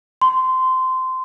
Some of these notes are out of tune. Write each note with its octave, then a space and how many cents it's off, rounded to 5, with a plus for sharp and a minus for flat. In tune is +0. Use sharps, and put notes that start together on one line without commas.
C6 -15